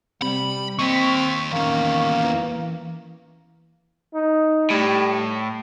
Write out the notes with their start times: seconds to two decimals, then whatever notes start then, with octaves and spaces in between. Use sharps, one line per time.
0.22 C3 G3 B5
0.79 A#3 C4 D#5 C#6 B6
1.52 E2 D#3 A#3 C#4
2.24 E3
4.14 D#4
4.70 A2 G3